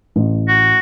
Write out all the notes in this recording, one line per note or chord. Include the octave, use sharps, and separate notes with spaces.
A1
F#4